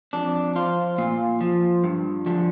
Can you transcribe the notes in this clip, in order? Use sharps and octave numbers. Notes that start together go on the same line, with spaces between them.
F2 D4
F3 F4
A#2 F4
F3
G2
D3 F3